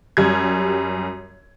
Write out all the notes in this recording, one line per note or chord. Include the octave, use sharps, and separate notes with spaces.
F#2 G3 G#6